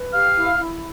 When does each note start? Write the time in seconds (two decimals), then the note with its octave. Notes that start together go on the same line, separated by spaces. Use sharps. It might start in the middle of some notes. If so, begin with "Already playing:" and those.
Already playing: B4
0.13 G4 F5 F6
0.36 E4
0.58 E4